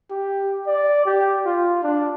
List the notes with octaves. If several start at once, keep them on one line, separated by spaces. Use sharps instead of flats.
G4
D5
G4
F4
D4